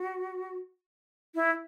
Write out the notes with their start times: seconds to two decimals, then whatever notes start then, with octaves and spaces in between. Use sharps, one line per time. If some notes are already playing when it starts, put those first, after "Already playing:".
Already playing: F#4
1.35 E4